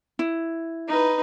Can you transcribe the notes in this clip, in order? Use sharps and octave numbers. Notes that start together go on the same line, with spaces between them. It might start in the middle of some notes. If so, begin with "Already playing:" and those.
E4
D#4 B4